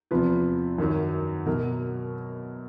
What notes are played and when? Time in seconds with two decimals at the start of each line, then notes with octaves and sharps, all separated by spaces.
0.11 E2 C3 F3 B4
0.78 F#2 D#3 F#3
1.46 B2 F#3 A#4